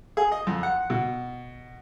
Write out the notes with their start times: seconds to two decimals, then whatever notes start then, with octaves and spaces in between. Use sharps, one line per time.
0.17 G#4
0.32 D#5
0.47 F2
0.63 F#5
0.90 B2